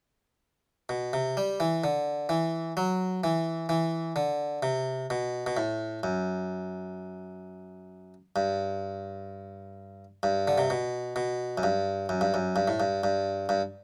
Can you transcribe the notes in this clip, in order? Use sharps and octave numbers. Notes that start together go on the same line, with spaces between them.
B2
C3
G3
E3
D3
E3
F#3
E3
E3
D3
C3
B2
B2
A2
F#2
G2
G2
D3
C3
B2
B2
F#2
G2
F#2
G2
F#2
G2
A2
G2
G2
G2